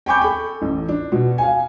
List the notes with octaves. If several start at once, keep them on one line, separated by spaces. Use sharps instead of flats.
G5 G#5 B5 C#6 D6 G6
A4 B5
A1
D4
B2
F5 G#5